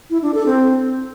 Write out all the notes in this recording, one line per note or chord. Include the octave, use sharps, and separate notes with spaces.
E4
D4
A4
C4